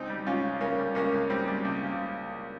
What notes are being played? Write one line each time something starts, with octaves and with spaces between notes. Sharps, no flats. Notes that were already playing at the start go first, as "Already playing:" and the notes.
Already playing: C#2 C4 D#4
G3
C#2 C#4 F4
C#3
C#3 A#3 C#4
G3
C#2 A#3 C#4
C#2
G3 C4
G3
C#2
C#3